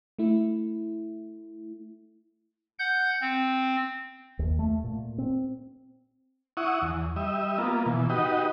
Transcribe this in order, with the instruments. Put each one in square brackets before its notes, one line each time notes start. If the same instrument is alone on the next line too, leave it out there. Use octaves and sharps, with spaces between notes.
[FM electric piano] A3 E4
[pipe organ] F#5 G6
C4
[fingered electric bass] D#2
A3
A#2
C4
[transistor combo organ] E4 F#5 C#6 D#6
E2
G3 D#5 E5
A#3 B3 F4
B2 E3
D#4 F#4 G4 B4 D#5